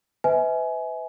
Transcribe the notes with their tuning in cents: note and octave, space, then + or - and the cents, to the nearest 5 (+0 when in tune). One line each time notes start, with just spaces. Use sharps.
B4 +35 E5 -35 G#5 +20